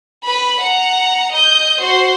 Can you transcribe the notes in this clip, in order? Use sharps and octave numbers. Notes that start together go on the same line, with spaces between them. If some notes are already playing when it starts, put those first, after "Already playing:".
B4 B5
F#5 A#5
D#5 G6
F#4 C5